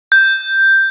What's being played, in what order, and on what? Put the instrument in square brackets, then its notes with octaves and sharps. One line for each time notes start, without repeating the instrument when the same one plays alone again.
[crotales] G6